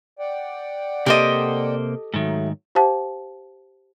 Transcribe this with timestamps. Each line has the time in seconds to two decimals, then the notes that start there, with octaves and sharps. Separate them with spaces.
0.19 D5 F#5 G5
1.06 C3 A#3 G4 A4 C5 D#5
2.14 G#2 D#3 F#3 A3
2.75 G4 C5 F5 G5 A5